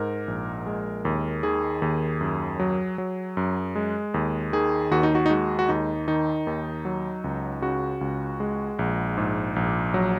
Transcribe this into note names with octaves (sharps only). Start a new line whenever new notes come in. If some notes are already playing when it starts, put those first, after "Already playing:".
Already playing: G#2 A#4
A#1
G#3
D#2
D#3 G#4
D#2
F#2
F#3
F#3
F#2
G#3
D#2
D#3 G#4
D#2 F#4
D#4
F#4
D#4
G#3 F#4
F#4
D#2 D#4
D#3 D#4
D#2
F#3
C#2
C#3 F#4
C#2
G#3
A#1
G#2
A#1
F#3